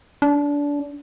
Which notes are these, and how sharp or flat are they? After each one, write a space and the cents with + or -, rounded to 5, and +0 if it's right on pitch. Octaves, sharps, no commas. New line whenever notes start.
D4 -25